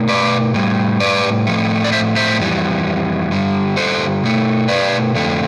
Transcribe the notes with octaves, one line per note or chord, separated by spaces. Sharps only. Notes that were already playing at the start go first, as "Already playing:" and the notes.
Already playing: B2 A3
B4 D5
A2 G3
B4 D5
A2 F3 A3
D5
C5 E5
C5 E5
F2 E3 G3
G2 D3 G3
A4 C5
B2 A3
B4 D5
F2 D3 A3